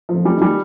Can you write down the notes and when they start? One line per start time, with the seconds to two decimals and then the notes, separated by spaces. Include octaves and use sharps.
0.09 F3
0.14 F2
0.25 G3
0.36 D#3
0.41 G3